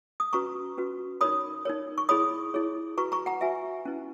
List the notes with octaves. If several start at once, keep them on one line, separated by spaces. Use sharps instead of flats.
D#6
C#4 F#4 B4 A#5 C#6
C#4 F#4 B4
D#4 A#4 C#5 B5 D#6
D#4 A#4 C#5
C#6
E4 G#4 C#5 B5 D#6
E4 G#4 C#5
F#4 B4 A#5 C#6
A#5 C#6
F#5 A#5
F#4 B4 E5 G#5
C#4 E4 B4